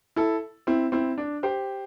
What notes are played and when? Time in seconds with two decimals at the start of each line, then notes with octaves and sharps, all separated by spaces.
0.16 E4 A4
0.67 C4 E4
0.92 C4 E4
1.18 D4
1.43 G4 C5